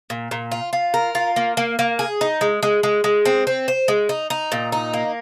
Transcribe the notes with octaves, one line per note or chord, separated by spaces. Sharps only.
A#2
A#2
F4
F4
A#4
F4
A#3
A#3
A#3
G#4
D#4
G#3
G#3
G#3
G#3
C4
C4
C5
G#3
D#4
D#4
A#2
D#4
A#3